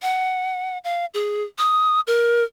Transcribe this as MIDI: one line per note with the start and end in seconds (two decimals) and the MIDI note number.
0.02 0.78 78
0.84 1.06 77
1.14 1.44 68
1.59 2.00 87
2.07 2.44 70